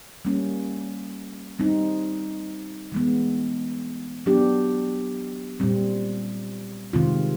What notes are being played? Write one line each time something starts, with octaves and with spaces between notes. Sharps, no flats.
G3 A#3 C#4
G3 C4 D#4
E3 G#3 B3
F#3 B3 D4 G4
A#2 G3 C4
C3 D#3 G#3 C4 F4